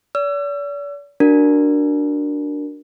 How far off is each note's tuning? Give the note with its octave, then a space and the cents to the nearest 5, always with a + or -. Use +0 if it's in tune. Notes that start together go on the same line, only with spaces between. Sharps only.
D5 -45 E6 +40
D4 +0 F#4 +0 A#4 +0